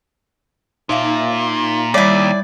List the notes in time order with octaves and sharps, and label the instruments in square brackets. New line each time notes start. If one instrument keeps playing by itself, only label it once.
[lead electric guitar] A#2 [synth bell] D#4 E5 F5
[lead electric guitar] D#2 [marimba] G3 [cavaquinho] E4 D5 [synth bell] C#5 E5